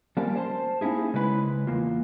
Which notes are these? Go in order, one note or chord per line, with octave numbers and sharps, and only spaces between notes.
F3 G3 A#3 C#4 A#4 D5
C5 A5 C6
A#3 C#4 D#4 E4 G#4
C#3 G#3 E4 B4 D5 B5
E2 A#3 F4